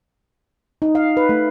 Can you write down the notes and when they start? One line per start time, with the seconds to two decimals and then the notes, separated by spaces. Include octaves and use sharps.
0.82 D#4
0.95 F5
1.17 B4
1.29 A3